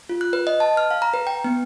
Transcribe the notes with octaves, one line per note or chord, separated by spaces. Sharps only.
F4
F#6
B4
D#5
A5
F6
F5
A#5
B4
G5
B3